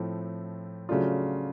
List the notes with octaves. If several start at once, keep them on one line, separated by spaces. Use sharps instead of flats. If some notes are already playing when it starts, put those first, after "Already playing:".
Already playing: A2 F3 A3 C4
C#3 F#3 A3 D4 F4